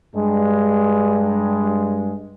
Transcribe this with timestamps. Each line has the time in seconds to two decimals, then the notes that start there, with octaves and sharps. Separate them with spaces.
0.16 G2 G#3